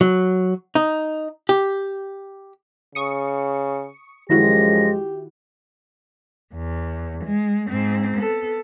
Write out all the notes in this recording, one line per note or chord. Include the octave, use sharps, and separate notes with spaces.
F#3
D#4
G4
C#3 C#6 D#6 C#7
F#2 D#3 F3 G#3 E4 F#4 G4 A#6
E2
G#3
G#2 C4
B3 A4